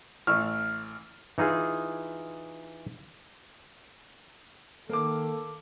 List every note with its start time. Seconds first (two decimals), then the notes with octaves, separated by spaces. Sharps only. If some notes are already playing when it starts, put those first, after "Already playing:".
0.27 A1 C#6 E6 F6
1.38 E3 D#4 F4 G#4
4.90 D#3 A#3 A4 A#4 D6